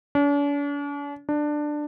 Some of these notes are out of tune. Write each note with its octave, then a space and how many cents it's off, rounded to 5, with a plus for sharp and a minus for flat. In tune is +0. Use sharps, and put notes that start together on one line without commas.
D4 -45
D4 +15